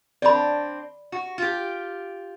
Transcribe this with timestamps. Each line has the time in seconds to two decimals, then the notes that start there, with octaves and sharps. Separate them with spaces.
0.22 C4 D4 D5 B5
1.12 F#4
1.38 F4 G4